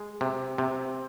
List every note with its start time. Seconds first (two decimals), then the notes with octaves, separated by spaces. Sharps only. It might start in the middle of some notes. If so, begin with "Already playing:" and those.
Already playing: G#3
0.21 C3
0.58 C3